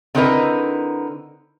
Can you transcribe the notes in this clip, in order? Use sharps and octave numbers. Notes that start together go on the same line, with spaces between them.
D3 C4 D#4 E4 A#4 B4